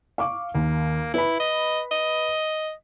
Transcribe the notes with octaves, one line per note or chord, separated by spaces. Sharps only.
F5 C#6 D6
D#2 A#3
E4 B4 B5
D#5
D#5